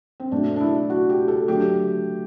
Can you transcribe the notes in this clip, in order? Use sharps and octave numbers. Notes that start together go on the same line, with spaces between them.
C4
B2 A3 D4
D4
E4
F#4
G4
A4
D3 F#3 A3 G4